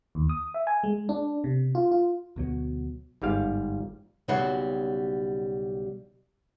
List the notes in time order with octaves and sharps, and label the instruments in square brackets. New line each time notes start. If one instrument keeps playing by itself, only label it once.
[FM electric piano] D#2
D#6
E5
G#5
G#3
D4
C3
F4
F4
[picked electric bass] D2 B2 F#3
[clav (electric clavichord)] G1 G#2 G3 F5
[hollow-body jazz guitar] B1 C#3 F#3 G3 C4 F#5